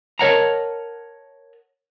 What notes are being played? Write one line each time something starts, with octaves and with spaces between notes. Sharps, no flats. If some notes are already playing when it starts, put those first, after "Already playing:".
A#4 C#5 D#5 F#5 A5 A#5